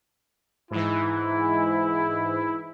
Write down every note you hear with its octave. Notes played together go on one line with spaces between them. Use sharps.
G#2 E3 E4